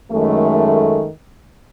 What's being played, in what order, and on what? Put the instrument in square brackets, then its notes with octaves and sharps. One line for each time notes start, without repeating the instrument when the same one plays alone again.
[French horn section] F#2 D#3 G#3 A3